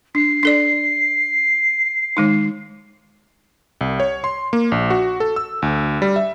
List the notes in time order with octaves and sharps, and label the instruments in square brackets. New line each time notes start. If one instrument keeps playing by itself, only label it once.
[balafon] D4 [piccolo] C7
[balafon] D4 A4 D5
D#3 G#3 D#4
[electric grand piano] C2
C#5
C6
A#3
A#1
F#4
A4
E6
D2
G3
E5